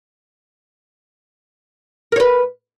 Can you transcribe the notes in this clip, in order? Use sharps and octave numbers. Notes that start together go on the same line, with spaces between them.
A#4 B4 C#5